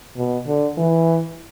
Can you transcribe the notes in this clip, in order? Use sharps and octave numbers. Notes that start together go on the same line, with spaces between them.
B2
D3
E3